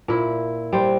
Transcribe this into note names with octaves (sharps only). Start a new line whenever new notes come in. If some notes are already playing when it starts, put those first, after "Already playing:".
A#2 E4
G3 C5